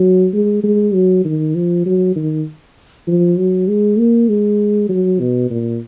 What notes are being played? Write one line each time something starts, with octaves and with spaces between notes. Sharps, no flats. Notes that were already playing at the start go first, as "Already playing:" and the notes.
Already playing: F#3
G#3
G#3
F#3
D#3
F3
F#3
D#3
F3
F#3
G#3
A#3
G#3
F#3
B2
A#2